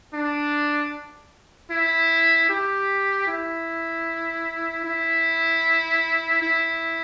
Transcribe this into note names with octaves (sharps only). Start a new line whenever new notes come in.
D4
E4
G4
E4
E4
E4